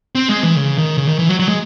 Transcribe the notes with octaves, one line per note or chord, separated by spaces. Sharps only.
C4
G#3
E3
C#3
D#3
C#3
D#3
E3
F#3
F#3
G#3